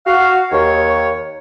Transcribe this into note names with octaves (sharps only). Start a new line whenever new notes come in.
F#4 F5
D#2 C#5